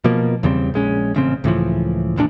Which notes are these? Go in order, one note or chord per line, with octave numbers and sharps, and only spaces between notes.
B2 F3 A#3
E2 C#3 G3 C4
A#1 G#3 C#4
A1 C#3 C4
C#2 A2 E3 F3
D#1 E2 A#2 D4